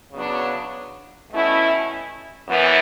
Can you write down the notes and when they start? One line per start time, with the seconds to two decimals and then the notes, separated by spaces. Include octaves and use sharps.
0.12 C#3 F#3 B3 D4
1.31 B2 A3 C#4 E4
2.49 F#2 E3 B3